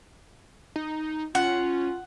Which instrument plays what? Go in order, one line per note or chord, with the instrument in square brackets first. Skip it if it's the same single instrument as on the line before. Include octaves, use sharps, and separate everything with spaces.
[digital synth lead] D#4
[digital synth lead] C#4 [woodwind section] F4 [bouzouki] F#5